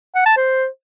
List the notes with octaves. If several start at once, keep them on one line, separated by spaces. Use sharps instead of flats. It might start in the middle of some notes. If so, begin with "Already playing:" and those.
F#5
A5
C5